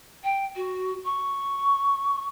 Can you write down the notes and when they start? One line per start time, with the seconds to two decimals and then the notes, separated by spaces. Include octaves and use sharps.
0.24 G5
0.56 F#4
1.05 C#6